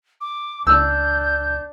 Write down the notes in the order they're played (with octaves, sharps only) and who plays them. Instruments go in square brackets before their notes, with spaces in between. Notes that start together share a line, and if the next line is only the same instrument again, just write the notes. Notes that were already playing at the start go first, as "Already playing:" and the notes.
[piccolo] D6
[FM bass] C#2 [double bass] D4 [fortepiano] E6 [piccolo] G6